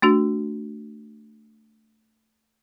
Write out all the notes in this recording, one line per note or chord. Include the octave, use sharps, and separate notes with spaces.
A3 D4 F#4